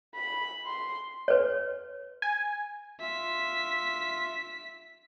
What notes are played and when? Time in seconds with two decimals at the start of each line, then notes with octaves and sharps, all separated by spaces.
0.15 B5
0.66 C6
1.28 B4 C#5
2.22 G#5
3.01 F4 E5 B6